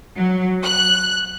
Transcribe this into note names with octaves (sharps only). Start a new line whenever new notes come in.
F#3
F#6